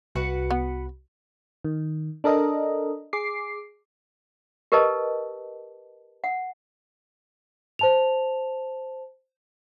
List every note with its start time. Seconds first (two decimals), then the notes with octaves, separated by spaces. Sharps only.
0.15 C2 F#4 B4 F#5
0.51 B3
1.65 D#3
2.24 D4 A4 A#4 D#5
3.13 G#4 D6 C7
4.72 G4 A#4 B4 D#5 A5
6.24 F#5
7.79 C5 A5 F7